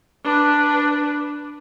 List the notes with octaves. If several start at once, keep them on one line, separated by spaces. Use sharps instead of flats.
D4 B4